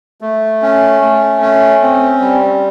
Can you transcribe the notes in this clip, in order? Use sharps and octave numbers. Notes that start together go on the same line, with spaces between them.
A3
C#4
A3
C#4
C4
G3